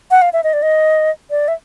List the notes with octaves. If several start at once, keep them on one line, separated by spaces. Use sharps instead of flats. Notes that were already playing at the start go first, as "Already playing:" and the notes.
F#5
F5
E5
D#5
D5
D#5
D5
E5